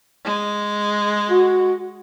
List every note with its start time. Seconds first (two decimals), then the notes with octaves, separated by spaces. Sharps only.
0.24 G#3
1.30 F#4